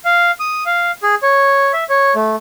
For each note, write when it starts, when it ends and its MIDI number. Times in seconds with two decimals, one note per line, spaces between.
0.05 0.31 77
0.40 0.64 87
0.66 0.91 77
1.03 1.15 68
1.23 1.72 73
1.73 1.84 76
1.90 2.14 73
2.16 2.36 57